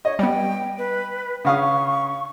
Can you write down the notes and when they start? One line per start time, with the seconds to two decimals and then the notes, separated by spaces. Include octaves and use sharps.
0.05 C#5 D#5
0.19 G3 B3 G5
0.78 B4
1.45 C#3 F5 C#6 D#6